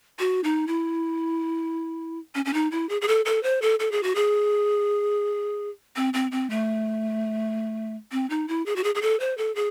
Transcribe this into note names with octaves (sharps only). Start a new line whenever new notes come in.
F#4
D#4
E4
C#4
C#4
D#4
E4
G#4
G#4
A4
A4
C5
A4
A4
G#4
F#4
G#4
C4
C4
C4
A3
C4
D#4
E4
G#4
F#4
G#4
G#4
A4
C5
A4
G#4